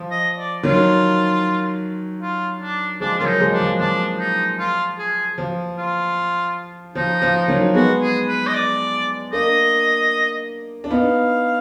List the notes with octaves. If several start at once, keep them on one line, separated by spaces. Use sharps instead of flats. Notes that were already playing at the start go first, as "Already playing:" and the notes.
Already playing: F3
D#5
D5
D#3 F#3 F4
F4
D4
F3 G#3 D4
F#3 A#3 F4
D#4
F3 G#3
D4
F3
F3 D4
D#4
F4
G#4
F3
F4
F3 D#4
F3
D#3 F#3
G#3 B3 F#4
G#4
B4
D#5
D5
A#3 D4 D#5
D4
B3 D#4 F5